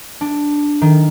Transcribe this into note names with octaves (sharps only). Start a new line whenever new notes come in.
D4
D#3